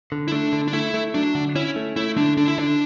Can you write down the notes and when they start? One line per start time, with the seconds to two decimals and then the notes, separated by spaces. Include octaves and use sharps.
0.12 D3
0.28 E4
0.32 A3 D4
0.53 D3
0.68 D4
0.73 A3 E4
0.94 A3
1.14 F#3 D4
1.35 D3
1.56 C#4 E4
1.76 A3
1.96 A3 E4
2.17 D3 D4
2.37 D3 D4
2.48 E4
2.58 D3 D4